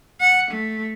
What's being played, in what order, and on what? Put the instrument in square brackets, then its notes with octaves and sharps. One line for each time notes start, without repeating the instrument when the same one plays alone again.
[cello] F#5
A3